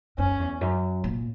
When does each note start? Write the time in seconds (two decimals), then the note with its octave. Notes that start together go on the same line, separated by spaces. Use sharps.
0.18 F#2 C#4
0.40 E2
0.61 F#2
1.04 A#2